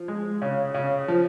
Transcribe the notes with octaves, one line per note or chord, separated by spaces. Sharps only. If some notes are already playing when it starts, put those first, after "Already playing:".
Already playing: F3
G#3
C#3
C#3
F3